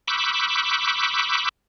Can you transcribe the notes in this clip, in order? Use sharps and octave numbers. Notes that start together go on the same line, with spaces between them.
B5 C#6 D6 E6 F#6 G6